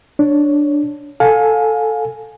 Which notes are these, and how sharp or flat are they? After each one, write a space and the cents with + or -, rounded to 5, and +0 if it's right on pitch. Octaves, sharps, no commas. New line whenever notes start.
D4 +0 C#5 +0
A4 +0 F5 +30 G#5 +5